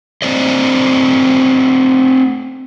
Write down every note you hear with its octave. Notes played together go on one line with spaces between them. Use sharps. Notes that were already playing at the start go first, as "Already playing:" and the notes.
A3 C4 C5 D5 D#5